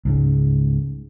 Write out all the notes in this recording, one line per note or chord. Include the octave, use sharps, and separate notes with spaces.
C#2 G#2 C#3